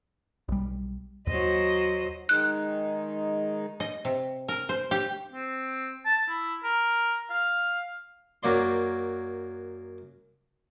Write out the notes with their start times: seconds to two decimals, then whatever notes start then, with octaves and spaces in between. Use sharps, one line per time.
0.48 B1 G3
1.27 D#2 F#3 C5 D#5
2.29 D#3 G#3 D#4 F#6
3.80 D#5
4.05 C3
4.48 A#4
4.69 C5
4.91 G4
5.32 C4
6.05 A5
6.28 E4
6.64 A#4
7.30 F5
8.43 F#2 F#3 A#3 D5 C6